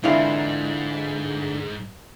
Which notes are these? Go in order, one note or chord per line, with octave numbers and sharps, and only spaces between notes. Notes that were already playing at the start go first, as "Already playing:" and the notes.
G#2 D3 E3 C4 D4 E4 F4 F5